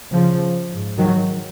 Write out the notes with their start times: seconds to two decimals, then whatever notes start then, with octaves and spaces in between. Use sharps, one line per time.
0.11 C#3 F3
0.69 G#2
0.98 D#3 F#3